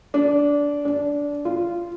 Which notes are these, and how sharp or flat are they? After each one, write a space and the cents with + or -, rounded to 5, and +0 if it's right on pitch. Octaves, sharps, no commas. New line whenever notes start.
D4 -20
D4 -20
F4 -15